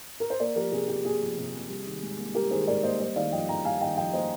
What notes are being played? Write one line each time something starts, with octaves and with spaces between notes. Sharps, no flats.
A#4
C5
A#3 A#4 D5
F3 G4 A#4
C3 G#4
C3 G4
A#3 G#4
F3
C3
C3
G3
D#3
G#2
A#3
G3 G4 A#4
D#3 G#4 C5
G#2 A#4 D5
A#3 C5 D#5
G3 C5 D#5
D#3 D5 F5
F2 D#5 G5
A#3 G5 A#5
G3 F5 G#5
D#3 D#5 G5
F2 D#5 G5
A#3 C5 D#5